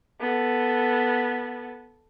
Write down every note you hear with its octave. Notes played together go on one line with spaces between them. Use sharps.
B3 A4